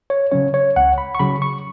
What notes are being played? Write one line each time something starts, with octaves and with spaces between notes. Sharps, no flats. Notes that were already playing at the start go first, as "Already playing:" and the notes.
C#5
C#3 F#3 C#4 C#5
C#5
C#2 F#5
B5
C#6
C#3 F#3 B5
C#6